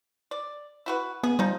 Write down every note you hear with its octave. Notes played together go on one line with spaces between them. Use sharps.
D5
E4 F#4 B4
B3 G#4
F3 G3 D#4